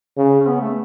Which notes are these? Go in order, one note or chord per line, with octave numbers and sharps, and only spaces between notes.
C#3
C#4
B3
A3